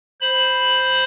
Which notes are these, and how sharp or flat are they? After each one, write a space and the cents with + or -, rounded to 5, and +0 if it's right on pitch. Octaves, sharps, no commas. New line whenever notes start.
C5 +0 B5 +0